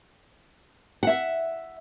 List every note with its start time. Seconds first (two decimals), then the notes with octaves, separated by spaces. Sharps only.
1.03 E5 F#5